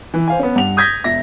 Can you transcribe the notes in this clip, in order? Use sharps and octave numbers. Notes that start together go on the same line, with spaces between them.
E3
C5 F5 G#5
B3 C#4
G2 F#5 F7
D#6 G6 G#6 A#6 B6
E1 E5 A#6